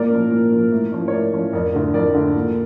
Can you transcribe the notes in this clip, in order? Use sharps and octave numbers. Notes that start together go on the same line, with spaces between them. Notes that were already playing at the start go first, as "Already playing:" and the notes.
Already playing: A#2 A#4 D5
F3 C#4
A#2
F3 C#4
A2
F3 C#4
C#5
A2 A#4 D5
F3 C#4
F2 A#4 D5
D3 A3
F2 A#4 D5
D3 A3
A#2